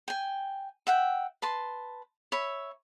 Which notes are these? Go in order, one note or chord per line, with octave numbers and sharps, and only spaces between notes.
G5 G#5
E5 F#5 G5
B4 A5 C6
C#5 E5 B5